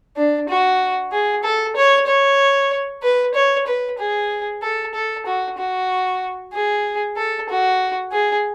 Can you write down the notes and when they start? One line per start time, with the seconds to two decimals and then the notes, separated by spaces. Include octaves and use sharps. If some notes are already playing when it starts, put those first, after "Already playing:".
0.17 D4
0.49 F#4
1.12 G#4
1.44 A4
1.76 C#5
2.07 C#5
3.02 B4
3.35 C#5
3.67 B4
3.99 G#4
4.62 A4
4.94 A4
5.26 F#4
5.58 F#4
6.53 G#4
7.17 A4
7.49 F#4
8.12 G#4